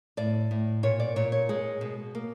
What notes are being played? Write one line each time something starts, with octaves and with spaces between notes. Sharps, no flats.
A2 D5
A2
A#2 C#5
D5
A#2 C#5
C#5
G#3 G#4
B2
A#3